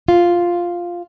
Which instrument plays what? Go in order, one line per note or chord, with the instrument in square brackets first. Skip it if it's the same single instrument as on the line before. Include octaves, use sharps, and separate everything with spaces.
[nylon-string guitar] F4